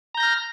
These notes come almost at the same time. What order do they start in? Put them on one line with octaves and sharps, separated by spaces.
A#5 G6 A#6 F6